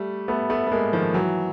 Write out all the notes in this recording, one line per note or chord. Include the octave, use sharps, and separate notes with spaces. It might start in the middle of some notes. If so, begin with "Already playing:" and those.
Already playing: G3 A3
A3 B3
A3 B3
B3
G#3 A#3
D#3 F3
E3 F#3